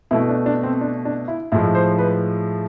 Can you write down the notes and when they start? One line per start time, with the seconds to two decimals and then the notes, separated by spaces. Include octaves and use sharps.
0.11 B2 A3 E4
0.29 D4
0.46 D4
0.63 C4
0.81 D4
1.05 D4
1.28 E4
1.52 A2 F3 G#3 E4
1.75 C5
1.98 B4